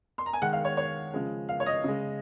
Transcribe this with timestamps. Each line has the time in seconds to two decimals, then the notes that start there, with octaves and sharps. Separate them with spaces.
0.18 C6
0.26 A#5
0.33 G#5
0.42 D#3 G#3 F#5
0.53 F5
0.65 C#5
0.77 C#5
1.13 C#3 F3 G#3
1.49 F5
1.60 C#5
1.66 D#5
1.84 C#3 G#3